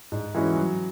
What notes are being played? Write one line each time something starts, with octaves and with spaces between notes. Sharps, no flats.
G#2
E3 G#3 C#4 F#4
F#3